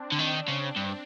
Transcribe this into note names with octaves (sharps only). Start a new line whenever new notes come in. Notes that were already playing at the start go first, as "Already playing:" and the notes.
Already playing: C4 D4
D3
D#3
C#3
G2